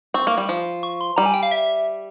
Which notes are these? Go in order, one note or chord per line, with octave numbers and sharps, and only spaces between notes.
C4 C#6
A#3
G3
F3
C#6
C6
G3 A#5
G#5
G5
F5
E5